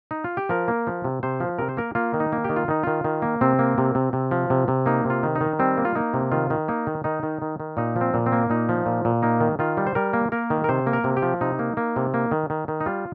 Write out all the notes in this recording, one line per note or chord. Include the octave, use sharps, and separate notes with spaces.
D#4
F4
G4
F3 A#4
A#3
F3
C3
C3 C5
F3
C3 A#4
C5
A#3 A#4
A#3 F4
D#3
D#4
A#3
D#3 G4
F4
D#3 D#4
D#3 F4
D#3
A#3
C3 C4
A#3
C3
C3
C3
F3
C3
C3
A#3 D#4
C3 F4
D#3
D#4
D#3
G3 C4
A#3
F4
A#3 D#4
C3
D#3 F4
D#3
A#3 D#4
D#3
D#3 D#4
D#3
D#3
D#3
A#2 D#4
F3
C4
A#2
C4
A#3
A#2 D#4
F3
A#2
A#2
A#3 D#4
D#3
D#3 F4
G3
C5
G3 A#4
A#3
A#3 A#4
D#3
A#4
C3 C5
A#3
A#4
C3
G4
F3
C3 D#4
A#3
A#3
C3
A#3
D#3
D#3
D#3
D#4
G3 F4